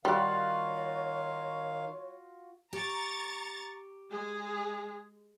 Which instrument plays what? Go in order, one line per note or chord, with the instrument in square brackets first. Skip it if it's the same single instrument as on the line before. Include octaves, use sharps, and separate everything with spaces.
[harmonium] D#3 F5 [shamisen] G3 [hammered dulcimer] F4 F#4 [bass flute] C#5
[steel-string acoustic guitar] G4 [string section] A#5 C#6 A6
[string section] G#3 [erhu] G#4